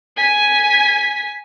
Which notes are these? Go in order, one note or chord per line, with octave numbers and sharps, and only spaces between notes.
G#5 B6